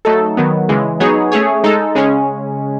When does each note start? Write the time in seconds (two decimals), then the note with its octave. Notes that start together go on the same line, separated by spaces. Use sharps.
0.05 F#3 A3 D#4 A4
0.37 D#3 F#3 B3
0.69 C#3 E3 G#3
1.00 F#3 B3 D#4 G#4 C#5
1.32 A3 C#4 G#4 C#5
1.64 G#3 D#4 A4
1.95 C#3 G#3 C#4